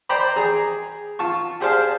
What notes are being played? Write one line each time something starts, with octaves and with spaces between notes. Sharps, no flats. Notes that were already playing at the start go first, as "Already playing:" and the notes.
C5 D5 G5 A#5 B5 D6
G#4 A#5
F4 A5 C#6
G4 G#4 C5 D5 F5 A5